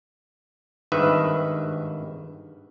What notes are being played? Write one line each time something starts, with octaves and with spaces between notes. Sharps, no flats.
G#1 G2 D#3 B4 E5